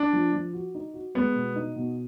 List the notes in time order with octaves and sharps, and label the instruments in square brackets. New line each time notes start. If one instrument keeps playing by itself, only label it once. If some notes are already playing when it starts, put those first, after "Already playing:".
Already playing: [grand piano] D4
[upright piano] F3
F3
F#4
D#4
F#4
[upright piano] G#3 [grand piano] B3
[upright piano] B2
D#4
B2